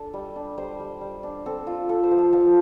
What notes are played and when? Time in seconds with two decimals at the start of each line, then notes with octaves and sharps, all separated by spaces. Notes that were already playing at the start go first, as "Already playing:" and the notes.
Already playing: D4 A4
0.13 G3
0.36 D4
0.58 G3 C5
0.80 G3
1.01 G3
1.23 D4
1.46 C4 A4
1.67 F4
1.89 F4 A4
2.04 C5
2.11 F3
2.18 F5
2.33 F3 A5